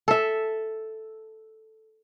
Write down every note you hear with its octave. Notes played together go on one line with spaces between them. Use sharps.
A4 E5